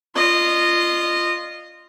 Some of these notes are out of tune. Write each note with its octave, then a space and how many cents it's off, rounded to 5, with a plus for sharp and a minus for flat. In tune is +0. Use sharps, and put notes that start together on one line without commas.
F4 -10 D#5 -20